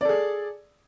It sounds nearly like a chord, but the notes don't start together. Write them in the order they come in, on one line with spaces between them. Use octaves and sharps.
D5 A4 G#4